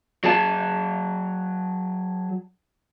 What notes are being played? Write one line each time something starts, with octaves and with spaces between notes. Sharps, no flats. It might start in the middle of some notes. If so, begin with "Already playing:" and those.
F#3 G#4 A5